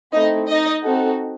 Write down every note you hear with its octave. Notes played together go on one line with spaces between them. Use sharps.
A3 C4 D#4 E4 D#5
D#4 D#5
C4 D#4 F#4 A4